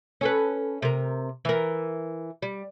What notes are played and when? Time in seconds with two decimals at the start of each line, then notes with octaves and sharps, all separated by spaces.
0.21 C#4 A4 B4
0.82 C3 A#4
1.45 E3 A#4
2.42 G3